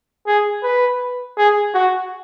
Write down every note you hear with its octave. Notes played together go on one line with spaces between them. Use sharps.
G#4
B4
G#4
F#4